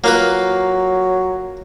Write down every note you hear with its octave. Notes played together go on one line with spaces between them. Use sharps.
F#3 A#3 F4 B4